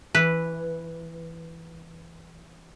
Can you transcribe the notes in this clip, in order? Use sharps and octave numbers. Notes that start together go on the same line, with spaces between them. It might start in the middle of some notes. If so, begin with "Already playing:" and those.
E3 B4